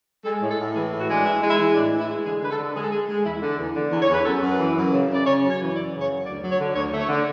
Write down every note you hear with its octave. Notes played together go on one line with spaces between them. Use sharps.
G#3 A4
A2
A4
A2
E3 G#4
A2
F#4
G#3 D4
E3 E4
G#3
E4
E3
A2 D4
E3
E4
G#3
D3 G#4
D3 B4
A4
D3
G#3 G#4
A4
G#3 G#4
G#3
E2 E4
D3
E2
D3
E2
C#5
E2
B4
F#2 A4
F#2
B4
E3
F#2
C#3
C#3 D5
C#3 C#5
F#2
C#5
E3
F#2 D5
C#3
C#5
F#2
D2 D5
F#3
C#5
D3
D2 C#5
A3
C#5
D3